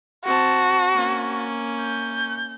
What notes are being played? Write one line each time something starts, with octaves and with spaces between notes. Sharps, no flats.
C4 F#4 A5
A#3 C#4
G6